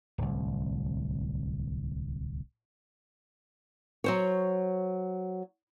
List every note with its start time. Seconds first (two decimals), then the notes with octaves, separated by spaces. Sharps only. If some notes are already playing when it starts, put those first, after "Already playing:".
0.18 D1 C2
4.04 F#3 C5 C#5